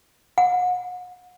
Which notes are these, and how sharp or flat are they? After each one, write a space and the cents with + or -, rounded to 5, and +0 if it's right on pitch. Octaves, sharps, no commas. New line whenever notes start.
F#5 -35